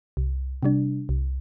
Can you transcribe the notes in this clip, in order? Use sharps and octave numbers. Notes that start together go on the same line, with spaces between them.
C2
C3 G3 D4
C2